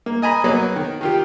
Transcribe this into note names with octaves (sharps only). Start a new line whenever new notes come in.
A#3
D#5 G#5 A#5 B5
F#3 A#3 B3
D#3
D#3 F4 G4